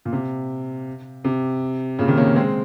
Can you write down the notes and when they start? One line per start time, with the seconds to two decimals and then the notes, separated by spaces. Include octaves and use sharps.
0.05 A#2
0.13 C3
1.24 C3
1.99 A#2 C#3
2.08 C3 D#3
2.17 A#3 C#4
2.36 G#3 C4